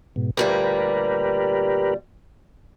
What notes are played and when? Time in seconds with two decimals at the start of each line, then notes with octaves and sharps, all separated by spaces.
0.16 G#2 B2
0.37 D2 A#2 G3 G4 A#4 B4